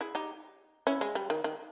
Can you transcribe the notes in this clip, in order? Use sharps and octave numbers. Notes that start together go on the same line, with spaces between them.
E4 G#4
D#4 G4
C#4 E4
G#3
G3
D#3
D#3